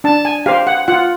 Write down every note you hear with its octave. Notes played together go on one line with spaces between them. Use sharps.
D4 A5
G#5
G4 C5 F5
F#5
F4 F#5